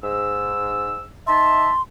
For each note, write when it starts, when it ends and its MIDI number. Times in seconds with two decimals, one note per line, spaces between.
0.04 1.04 44
0.04 1.04 88
1.27 1.70 63
1.27 1.70 76
1.27 1.70 81
1.27 1.82 84